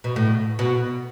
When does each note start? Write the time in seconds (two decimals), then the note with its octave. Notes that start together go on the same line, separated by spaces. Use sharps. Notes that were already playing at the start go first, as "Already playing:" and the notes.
0.04 B2
0.16 A2
0.59 B2